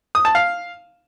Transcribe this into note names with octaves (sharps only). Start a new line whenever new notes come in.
D#6
A5
F5